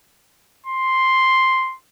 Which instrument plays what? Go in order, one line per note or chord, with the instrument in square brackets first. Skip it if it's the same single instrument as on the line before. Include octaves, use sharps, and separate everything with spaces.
[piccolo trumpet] C6